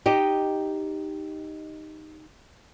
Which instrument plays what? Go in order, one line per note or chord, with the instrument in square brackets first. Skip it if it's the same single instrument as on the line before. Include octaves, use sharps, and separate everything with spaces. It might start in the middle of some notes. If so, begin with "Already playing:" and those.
[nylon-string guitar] D#4 G4 D#5